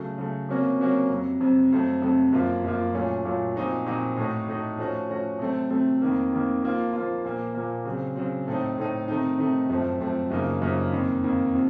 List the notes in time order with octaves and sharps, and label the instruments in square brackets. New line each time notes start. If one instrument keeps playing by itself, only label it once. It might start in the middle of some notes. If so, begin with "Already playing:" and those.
Already playing: [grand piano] C#3 F#3 A3
C#3 F#3 A3
C3 F#3 A#3 C#4 F#4
C3 F#3 A#3 C#4 F#4
F2 C3 F#3
F2 C3 F#3
F2 C3 F#3 A3 C4
F2 C3 F#3 A3 C4
F#2 F3 A#3 F4
F#2 F3 A#3 F4
A#2 F#3 A3 C#4 F4
A#2 F#3 A3 C#4 F4
A#2 F3 C4 D#4 F#4
A#2 F3 C4 D#4 F#4
A2 A3 D#4 F#4
A2 A3 D#4 F#4
F3 A3 C#4 F#4
F3 A3 C#4 F#4
C3 F#3 A3 C4
C3 F#3 A3 C4
F2 D#3 A#3
F2 D#3 A#3
F3 A#3 F4
F3 A#3 F4
A#2 F3 A#3
A#2 F3 A#3
C#3 F#3 C4
C#3 F#3 C4
A2 A3 C4 D#4
A2 A3 C4 D#4
C3 D#3 A3 D#4
C3 D#3 A3 D#4
F#2 F3 A3 C4
F#2 F3 A3 C4
F#2 C#3 F3 A#3 D#4
F#2 C#3 F3 A#3 D#4
F2 D#3 A#3
F2 D#3 A#3
C3 F3